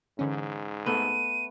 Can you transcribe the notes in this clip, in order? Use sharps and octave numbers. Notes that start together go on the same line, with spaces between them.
G#2 D3 E3 C#4
A3 B3 D#7